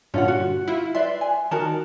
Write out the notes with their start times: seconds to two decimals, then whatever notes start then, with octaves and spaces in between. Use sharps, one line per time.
0.14 G2 A#2 D3 C#4 F4 F#5
0.28 F#4
0.68 E4 F4
0.95 B4 D5 E5 C6
1.21 G#5
1.51 D#3 D#4 F#4 A#4 A5